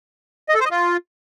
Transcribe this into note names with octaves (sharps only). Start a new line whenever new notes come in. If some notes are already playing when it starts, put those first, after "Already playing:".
D#5
A4
C5
D#5
F4